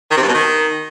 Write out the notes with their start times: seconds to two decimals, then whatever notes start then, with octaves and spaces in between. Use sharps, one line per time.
0.11 D#3
0.17 C3
0.23 G2
0.28 B2
0.34 D#3